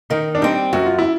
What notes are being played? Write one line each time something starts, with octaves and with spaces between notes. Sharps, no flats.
D#3 D#4
D4
G3 C4 D#4
F#2 F#4
F4
E4